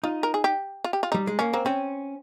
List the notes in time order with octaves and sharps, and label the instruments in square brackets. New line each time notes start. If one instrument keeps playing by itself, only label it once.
[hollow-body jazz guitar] D#4 [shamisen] F4
[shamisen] A#4
G#4
G4
F4
G4
F4
[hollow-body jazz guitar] G3 [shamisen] D#4
[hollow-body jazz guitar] G#3
[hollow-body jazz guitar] A#3 [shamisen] C#4
[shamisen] A#3 [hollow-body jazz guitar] C4
[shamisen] C4 [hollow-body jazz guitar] C#4